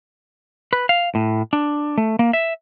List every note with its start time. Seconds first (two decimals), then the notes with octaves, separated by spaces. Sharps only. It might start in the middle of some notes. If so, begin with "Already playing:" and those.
0.73 B4
0.89 F5
1.15 A2
1.53 D4
1.98 A3
2.19 A#3
2.33 E5